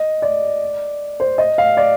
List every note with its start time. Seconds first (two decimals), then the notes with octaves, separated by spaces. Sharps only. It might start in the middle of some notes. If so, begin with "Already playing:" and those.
Already playing: D#5
0.22 D5
1.20 C5
1.38 D#5
1.58 F5
1.77 D5